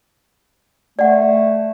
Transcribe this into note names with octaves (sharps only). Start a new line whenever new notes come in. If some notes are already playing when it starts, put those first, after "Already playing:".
A3 D5 F#5